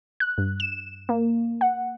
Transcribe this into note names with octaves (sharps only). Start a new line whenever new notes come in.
F#6
G2
E7
A#3
F#5